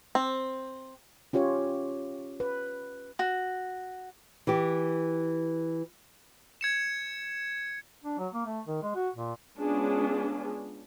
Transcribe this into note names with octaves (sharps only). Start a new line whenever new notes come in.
C4
C#4 F4 G4 C#5
B4
F#4
E3 G4
G#6 C#7 E7
D4
F#3
A#3
A3
D#3
G#3
F#4
A#2
G#3 B3 C#4 D4 F4 G#4